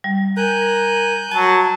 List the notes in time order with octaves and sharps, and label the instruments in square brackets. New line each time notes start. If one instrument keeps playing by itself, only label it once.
[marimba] G3
[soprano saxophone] A#4 [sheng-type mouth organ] G#5 F#6 G6
[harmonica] F#3 [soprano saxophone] A5